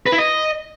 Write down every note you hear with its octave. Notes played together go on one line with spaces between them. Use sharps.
B4
E4
D#5